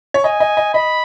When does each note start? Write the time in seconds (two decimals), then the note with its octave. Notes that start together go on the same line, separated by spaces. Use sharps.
0.14 C#5
0.24 D#5 G#5
0.40 D#5
0.57 D#5
0.74 D#5 B5